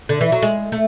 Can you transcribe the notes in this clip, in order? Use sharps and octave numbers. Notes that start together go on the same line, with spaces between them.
D3
E3
F#3
G#3
A3